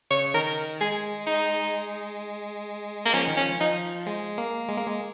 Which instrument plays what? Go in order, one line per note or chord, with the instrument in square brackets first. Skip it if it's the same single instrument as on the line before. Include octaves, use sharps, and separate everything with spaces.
[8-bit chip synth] C#3 [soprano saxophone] C#5
[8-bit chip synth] D#3 [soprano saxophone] A#4
[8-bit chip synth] G#3 [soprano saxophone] G#4
[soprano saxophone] D#4
A#3
[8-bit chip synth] F3 [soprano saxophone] C#4
[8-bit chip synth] D#3
[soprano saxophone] C#4
[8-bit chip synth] F3
[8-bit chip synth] F3 [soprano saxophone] D#4
[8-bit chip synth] G#3
A#3
G#3
A#3
G#3